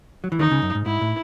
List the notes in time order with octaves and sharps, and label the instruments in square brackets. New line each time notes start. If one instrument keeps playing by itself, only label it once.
[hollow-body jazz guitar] F#3
E3
[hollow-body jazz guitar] D#2 D#3 [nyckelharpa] D#4
[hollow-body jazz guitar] C#2 C#3
F#2
G#2
[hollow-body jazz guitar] G#2 [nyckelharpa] E4
[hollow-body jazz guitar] A2